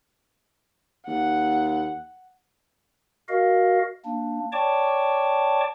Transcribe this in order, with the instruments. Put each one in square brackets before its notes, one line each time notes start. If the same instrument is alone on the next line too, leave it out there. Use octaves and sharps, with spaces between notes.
[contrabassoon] D#2 [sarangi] F#5
[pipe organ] F#4 A#4 D#5 F5
A#3 D4
C#5 D5 G5 A5 C#6 D6